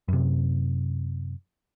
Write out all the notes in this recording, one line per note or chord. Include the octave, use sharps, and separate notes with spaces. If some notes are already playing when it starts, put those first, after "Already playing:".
F#2 C3